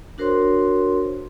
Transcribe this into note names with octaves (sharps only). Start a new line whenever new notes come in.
D4 F#4 A#4 C5 C#5 C6